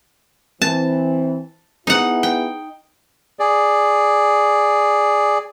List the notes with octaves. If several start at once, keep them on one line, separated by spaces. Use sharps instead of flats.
E3 C4 A5
B3 D#4 E4 G#4 F#5
G5
G#4 D5